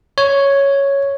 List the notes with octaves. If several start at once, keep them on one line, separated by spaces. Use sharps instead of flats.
C#5